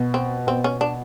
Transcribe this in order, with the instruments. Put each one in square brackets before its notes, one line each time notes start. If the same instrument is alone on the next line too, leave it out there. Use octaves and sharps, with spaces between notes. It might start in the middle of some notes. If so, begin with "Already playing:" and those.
Already playing: [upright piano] B2
[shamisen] C4
[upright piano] B2 [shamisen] C4
[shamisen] C#4
D4